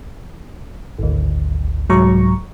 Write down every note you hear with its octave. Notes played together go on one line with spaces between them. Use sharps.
G#1 D2
C2 G#2 F#3 A#5 C#6